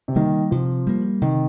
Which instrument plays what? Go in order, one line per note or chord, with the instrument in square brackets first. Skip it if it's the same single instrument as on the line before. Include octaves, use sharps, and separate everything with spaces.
[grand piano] C3
[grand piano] D#3 [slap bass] G3 A#3
[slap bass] C3 [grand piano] F3
[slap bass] G3 A#3
[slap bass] C3 [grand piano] D#3